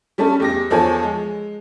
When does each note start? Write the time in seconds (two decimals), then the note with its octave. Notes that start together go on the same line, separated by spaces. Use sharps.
0.18 G3 A3 C#4 A4
0.40 E2 G4 A#6
0.70 E2 F3 A4 C#5 G#5
1.03 G#3